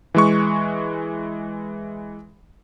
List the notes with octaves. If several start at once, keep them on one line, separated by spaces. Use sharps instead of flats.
E3 G#3 C#6